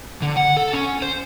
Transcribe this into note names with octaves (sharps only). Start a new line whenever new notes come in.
D3
F#5
A4
C#4
C5